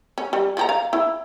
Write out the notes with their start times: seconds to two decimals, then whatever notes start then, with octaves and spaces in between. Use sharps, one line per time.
0.18 C#4
0.33 G3
0.57 F3 G4 A#5
0.69 F5
0.93 E4